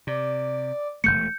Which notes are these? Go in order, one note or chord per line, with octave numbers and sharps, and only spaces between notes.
C3 D5
E1 C#2 A3 G6 C#7